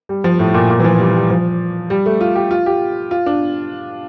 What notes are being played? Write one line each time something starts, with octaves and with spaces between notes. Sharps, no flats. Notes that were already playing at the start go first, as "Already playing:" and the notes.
G3
F3
A2
A#2
A#2
E3
F3
G3
G3
F3
G3
A3
F4
G4
F4
G4
F4
D4